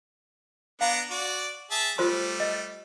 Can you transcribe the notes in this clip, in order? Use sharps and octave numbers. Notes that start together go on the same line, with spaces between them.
B3 D4 F5 A#5
F#4 D5
G#4 E5 A5
G3 A3 F4 C5 C6
D#5